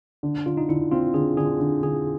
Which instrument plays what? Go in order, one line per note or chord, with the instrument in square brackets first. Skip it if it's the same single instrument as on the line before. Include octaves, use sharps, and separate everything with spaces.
[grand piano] D3
[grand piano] D3 [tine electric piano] F4
[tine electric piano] D#4
[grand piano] D3 [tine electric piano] E4
[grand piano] C4 [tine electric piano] F4
[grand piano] D3 [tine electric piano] G#4
[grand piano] D3 [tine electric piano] G#4
[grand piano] D3
[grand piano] D3 [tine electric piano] G#4